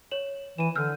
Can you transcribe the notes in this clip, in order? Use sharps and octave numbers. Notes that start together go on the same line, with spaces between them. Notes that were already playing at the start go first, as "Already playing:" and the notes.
C#5 E7 F#7
E3 D#7 E7
D3 E6 F6 G6